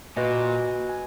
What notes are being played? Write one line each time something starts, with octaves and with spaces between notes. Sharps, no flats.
A#2 F#4 B4 D#5 G#5
G#5